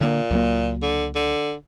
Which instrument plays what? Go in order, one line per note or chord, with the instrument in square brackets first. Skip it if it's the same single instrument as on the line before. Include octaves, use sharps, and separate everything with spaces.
[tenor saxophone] A#2 [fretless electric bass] D3 A#3
[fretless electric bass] C#2 F#3 A#3
[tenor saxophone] D3
D3